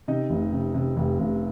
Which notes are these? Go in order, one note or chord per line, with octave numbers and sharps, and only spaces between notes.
C3 D#4 D#5
F1
C3
C3
F1
F1